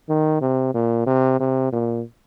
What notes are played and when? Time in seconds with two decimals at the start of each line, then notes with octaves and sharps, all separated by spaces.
0.09 D#3
0.41 C3
0.74 A#2
1.07 C3
1.40 C3
1.72 A#2